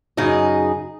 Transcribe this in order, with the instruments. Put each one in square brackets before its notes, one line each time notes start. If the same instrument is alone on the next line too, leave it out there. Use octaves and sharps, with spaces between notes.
[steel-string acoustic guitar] F#2 C#3 D#4 G#4 D#5